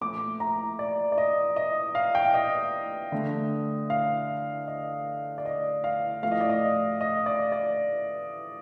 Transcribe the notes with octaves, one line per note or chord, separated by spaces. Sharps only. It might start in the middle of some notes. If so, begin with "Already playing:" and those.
A#2 F3 A3 D6
A#5
D5
D5
D#5
D#5
F5
G5
F5
D#5
D3 A3
F5
D#5
D5
D#5
F5
A2 F3 A3 F5
D#5
D5
D#5
D#5
D5
D5